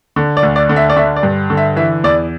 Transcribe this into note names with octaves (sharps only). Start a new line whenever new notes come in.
D3
D5
D2
D5
D3
E5
D5
D3 E5
D5
G2
D3
E5
E3 E5
E2 D5